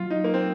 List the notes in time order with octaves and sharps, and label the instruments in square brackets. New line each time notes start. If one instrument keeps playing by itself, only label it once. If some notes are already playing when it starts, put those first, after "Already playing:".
Already playing: [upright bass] F#3 [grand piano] F4
[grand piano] D#4
A#3
C4